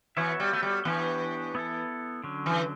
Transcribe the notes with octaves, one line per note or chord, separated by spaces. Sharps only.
E3 B3 F#4 C#5 E5
G3
A3
G3
E3 B3 D4 G4 C#5
B3 E4 A4
D3 F#3 C#4
E3